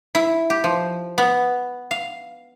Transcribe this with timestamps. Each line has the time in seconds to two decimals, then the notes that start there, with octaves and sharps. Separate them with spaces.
0.15 E4
0.50 G4
0.64 F3
1.18 B3
1.91 F5